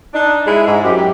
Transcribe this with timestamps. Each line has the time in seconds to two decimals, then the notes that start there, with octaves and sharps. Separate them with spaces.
0.14 D4 D#4
0.46 G#3 E4
0.66 G#2
0.84 F#2 G4